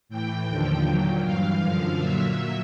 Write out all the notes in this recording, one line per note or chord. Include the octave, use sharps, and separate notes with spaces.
A2 E3 G5
D#2 D3 F3 G5
A#2 F#3 G5
G2 E3 F5
F#2 D3 F3 F5
A#2 F#3 E5